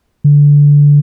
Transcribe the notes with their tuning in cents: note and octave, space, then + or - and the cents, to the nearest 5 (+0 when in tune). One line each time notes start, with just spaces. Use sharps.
D3 -15